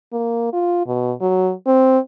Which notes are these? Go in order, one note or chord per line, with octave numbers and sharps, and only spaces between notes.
A#3
F4
B2
F#3
C4